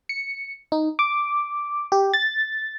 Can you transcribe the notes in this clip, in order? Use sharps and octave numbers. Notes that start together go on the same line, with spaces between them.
C#7
D#4
D6
G4
A6